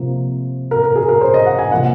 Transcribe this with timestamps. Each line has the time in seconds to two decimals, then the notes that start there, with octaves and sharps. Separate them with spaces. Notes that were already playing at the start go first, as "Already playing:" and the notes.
Already playing: C3 F3 A#3
0.71 A#4
0.84 A#4
0.96 G#4
1.09 A#4
1.21 C5
1.34 D#5
1.46 F#5
1.59 G#5
1.71 C3 F3 A#3 F#5